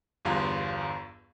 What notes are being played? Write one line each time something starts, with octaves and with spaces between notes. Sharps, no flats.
G1 E2 G2 F4 F5 A#5